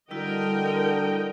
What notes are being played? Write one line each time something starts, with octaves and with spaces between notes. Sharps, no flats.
D3 G3 E4 F#4 A#4 D#5 G5